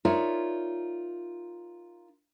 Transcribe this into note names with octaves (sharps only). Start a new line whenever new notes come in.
D#4 F4 A#4 C#5 D5 E5